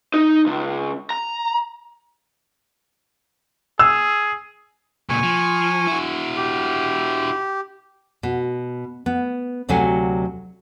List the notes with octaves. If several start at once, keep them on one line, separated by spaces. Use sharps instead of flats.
D#4
C#2
A#5
G#4 E6
C#2 A#2 G#5 C#6
F3
E4 F#4
G4
B2
B3
D2 C3 F#3 F#4 F5 G#5